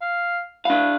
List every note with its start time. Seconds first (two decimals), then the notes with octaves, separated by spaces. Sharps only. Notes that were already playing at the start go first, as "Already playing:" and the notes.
0.01 F5
0.65 D4 E4 F5